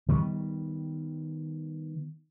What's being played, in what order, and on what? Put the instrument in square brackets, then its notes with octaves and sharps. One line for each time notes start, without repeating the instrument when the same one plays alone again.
[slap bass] D#3 G3 B3